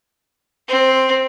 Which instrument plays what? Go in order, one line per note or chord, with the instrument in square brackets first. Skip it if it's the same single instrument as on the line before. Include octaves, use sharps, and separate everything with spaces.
[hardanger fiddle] C4